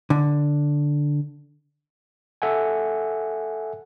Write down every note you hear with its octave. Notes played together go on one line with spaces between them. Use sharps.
D3
A4 E5 F#5 G#5